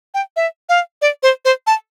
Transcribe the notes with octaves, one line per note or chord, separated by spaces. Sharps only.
G5
E5
F5
D5
C5
C5
A5